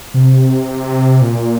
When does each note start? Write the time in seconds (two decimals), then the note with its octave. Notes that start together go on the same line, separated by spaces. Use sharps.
0.14 C3
1.22 A#2